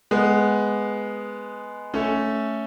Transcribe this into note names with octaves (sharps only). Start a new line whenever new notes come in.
G#3 B3
A3 C#4